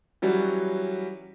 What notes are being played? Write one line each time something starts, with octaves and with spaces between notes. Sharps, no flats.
E3 F#3 G3 C#4 F#4